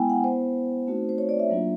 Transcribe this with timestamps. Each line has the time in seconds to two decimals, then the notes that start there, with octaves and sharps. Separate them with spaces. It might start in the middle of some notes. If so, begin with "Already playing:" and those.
Already playing: G#3 B3 E4 G5 G#5
0.10 F#5
0.24 B3 E4 C5
0.87 A3 C4 D#4 F#4
1.09 C5
1.18 C#5
1.29 D5
1.39 E5
1.50 F#3 A#3 D4 F4